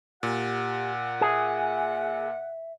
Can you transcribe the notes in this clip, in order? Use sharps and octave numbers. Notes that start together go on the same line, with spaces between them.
A#2 G4 F#5
G#4 E5